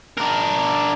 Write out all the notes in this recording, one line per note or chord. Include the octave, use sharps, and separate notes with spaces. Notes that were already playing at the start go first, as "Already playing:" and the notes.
D4 A#4